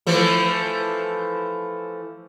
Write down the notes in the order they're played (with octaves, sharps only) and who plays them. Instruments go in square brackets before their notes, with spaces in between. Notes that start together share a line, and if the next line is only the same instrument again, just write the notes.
[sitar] E3 F3 A3